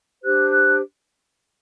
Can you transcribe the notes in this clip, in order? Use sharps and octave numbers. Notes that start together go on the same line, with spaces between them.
D4 G4 C5 F#6
F#6